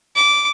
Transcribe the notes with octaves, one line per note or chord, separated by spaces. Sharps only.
D6